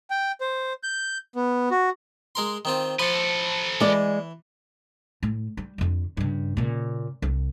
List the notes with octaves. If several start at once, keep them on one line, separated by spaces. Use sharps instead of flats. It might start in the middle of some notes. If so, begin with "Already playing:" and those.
G5
C5
G6
B3
F#4
G#3 A#4 C6
D#3 C4 F4
F3 A4 B4 C6
E3 G#3 D5
A2
G3
F2 D3
G2 C#3
A#2 C#3
C2